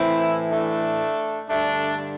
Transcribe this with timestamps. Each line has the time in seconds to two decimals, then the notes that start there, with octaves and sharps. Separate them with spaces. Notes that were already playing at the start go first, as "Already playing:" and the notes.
Already playing: A2 E3 C4 E4
0.48 A3 D4
1.48 G2 D3 A3 D4